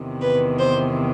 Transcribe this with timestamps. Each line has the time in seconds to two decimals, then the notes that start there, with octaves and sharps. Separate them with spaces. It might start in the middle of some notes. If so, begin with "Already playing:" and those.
Already playing: E2 C3 D#3
0.22 B4
0.59 C5